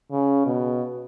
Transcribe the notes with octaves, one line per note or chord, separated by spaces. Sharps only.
C#3
B2